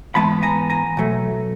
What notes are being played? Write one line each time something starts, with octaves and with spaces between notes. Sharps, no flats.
G#2 E3 G#3 B3 A5 B5
G#5 A#5
G#5 A#5
B2 F#3 A3